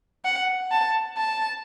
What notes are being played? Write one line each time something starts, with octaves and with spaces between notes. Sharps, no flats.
F#5
A5
A5